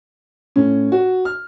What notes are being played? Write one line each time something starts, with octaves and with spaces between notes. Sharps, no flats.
A2 C#4
F#4
F6